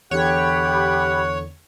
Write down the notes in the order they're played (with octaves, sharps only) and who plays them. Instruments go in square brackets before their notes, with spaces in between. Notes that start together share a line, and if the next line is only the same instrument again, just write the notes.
[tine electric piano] E2 D3 [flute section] G4 B5 [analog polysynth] C#5 [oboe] F#5